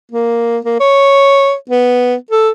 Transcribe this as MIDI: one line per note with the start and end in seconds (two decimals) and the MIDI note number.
0.11 0.58 58
0.65 0.76 58
0.80 1.54 73
1.70 2.15 59
2.31 2.50 69